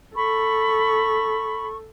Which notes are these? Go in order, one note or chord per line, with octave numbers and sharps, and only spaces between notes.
A4 B5 C#6